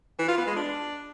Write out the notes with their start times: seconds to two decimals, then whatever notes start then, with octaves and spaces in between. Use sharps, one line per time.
0.19 E3
0.28 F4
0.38 B3
0.47 G#3
0.56 D4